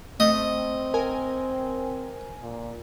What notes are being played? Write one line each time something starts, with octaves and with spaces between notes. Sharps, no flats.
A3 C4 D#5
A#4 G#5
A#2